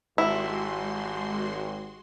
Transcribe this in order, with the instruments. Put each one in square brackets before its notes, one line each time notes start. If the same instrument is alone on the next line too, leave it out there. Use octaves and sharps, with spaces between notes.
[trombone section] G#1 G4 [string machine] G#3 F#4 C6 [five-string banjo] E4